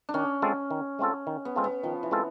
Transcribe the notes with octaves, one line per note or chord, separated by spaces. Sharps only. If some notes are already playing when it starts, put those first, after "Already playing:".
D4
D#3 C#4
G#3 C4 F4 A4
D#3
G#3 C4 F4 A4
D#3
B3
G#3 C4 F4 A4
B3
D#3 F3
E3
G#3 C4 F4 A4